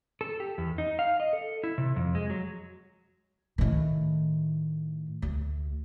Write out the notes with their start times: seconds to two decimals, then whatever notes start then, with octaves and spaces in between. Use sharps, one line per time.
0.21 A4
0.40 G4
0.58 E2
0.78 D#4
0.99 F5
1.20 D#5
1.33 A4
1.64 E4
1.78 C3
1.96 F2
2.15 G#3
2.30 F#3
3.58 A2 D#3
5.22 D2